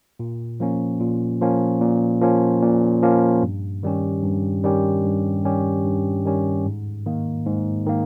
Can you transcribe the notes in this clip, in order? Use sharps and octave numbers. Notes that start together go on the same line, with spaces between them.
A#2
F3 A#3 C#4
A#2
F3 A#3 C#4
A#2
F3 A#3 C#4
A#2
F3 A#3 C#4
G2
D#3 G3 C#4 G4
G2
D#3 G3 C#4 G4
G2
D#3 G3 C#4 G4
G2
D#3 G3 C#4 G4
G#2
D#3 A#3
G#2
D#3 A#3